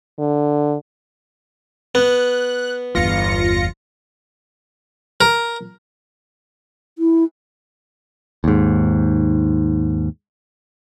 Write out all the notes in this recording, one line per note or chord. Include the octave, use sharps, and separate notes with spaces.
D3
B3 F#6
G1 E2 F4 A#6 C#7
A#4
E4
D#2 G#2